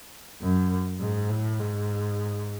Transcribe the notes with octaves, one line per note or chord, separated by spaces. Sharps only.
F#2
G#2
A2
G#2